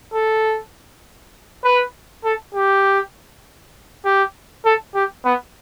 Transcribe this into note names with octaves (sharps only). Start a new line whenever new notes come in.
A4
B4
A4
G4
G4
A4
G4
B3